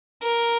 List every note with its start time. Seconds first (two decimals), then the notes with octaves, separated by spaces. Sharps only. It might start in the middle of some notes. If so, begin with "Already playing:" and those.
0.22 A#4